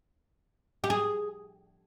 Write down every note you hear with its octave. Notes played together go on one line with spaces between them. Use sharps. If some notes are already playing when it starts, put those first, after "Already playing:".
G4
G#4